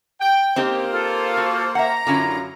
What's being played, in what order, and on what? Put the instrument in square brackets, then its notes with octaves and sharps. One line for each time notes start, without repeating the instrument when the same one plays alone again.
[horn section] G5
[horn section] A#3 C5 [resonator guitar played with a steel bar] C4 D#4 G4
[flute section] F4 A4
[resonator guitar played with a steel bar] F#4
[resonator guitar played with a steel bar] E5 F#5 [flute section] A#5
[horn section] F#2 F4 [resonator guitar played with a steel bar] D3 C#4 E4